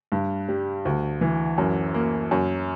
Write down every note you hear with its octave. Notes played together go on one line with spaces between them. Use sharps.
G2
G3
D2
E3
F#2
A#3
F#2